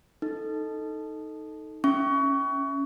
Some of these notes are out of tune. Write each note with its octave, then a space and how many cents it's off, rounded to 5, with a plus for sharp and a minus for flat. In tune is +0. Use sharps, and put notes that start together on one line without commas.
D#4 +5 A4 +0
C#4 +0 E5 +0 C#6 +25